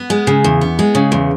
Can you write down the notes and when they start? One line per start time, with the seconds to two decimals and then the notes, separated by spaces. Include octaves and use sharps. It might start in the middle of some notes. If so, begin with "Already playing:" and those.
Already playing: B3
0.10 G#3
0.27 C#3
0.44 E2
0.61 B3
0.79 G#3
0.95 C#3
1.12 E2